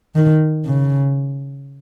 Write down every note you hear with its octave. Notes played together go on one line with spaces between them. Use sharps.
D#3
C#3